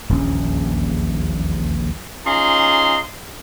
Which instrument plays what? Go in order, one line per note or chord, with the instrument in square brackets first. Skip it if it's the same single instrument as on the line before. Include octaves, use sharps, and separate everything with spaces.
[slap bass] D#1 A#1 E2 C#4
[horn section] C#4 D#4 F4 G#4 A#5 C6